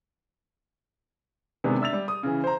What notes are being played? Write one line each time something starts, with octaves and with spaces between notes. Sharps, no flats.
C3 D#3 G#3 B3 D4 G#4
D4 E5 E6 A6 F7
G3
D#6
C#3 E3
C5 A#5